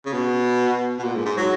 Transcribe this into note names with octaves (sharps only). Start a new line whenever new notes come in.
C#3
B2
B2
A#2
G#2
G#2
F#3